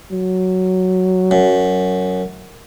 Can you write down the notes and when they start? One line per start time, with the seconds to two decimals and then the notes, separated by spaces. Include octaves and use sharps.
0.12 F#3
1.31 F#2